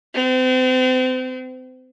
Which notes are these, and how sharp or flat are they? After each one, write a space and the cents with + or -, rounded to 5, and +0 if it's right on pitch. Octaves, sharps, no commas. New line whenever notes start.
C4 -35